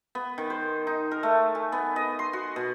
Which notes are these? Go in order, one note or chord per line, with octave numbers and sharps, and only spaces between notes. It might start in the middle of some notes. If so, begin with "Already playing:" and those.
B3
D#3
C5
D#4
A#4
A3
G#5
B3
D#5
C6
F#4
B2